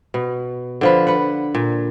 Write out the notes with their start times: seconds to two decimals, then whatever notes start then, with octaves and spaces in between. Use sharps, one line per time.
0.14 B2
0.81 D3 F3 B4
1.07 B4 F#5
1.55 A#2